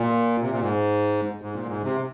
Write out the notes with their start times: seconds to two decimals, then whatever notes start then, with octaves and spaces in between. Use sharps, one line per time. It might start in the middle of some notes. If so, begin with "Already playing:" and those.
Already playing: A#2
0.42 C3
0.52 A#2
0.61 G#2
1.42 G#2
1.54 A#2
1.67 G#2
1.84 C3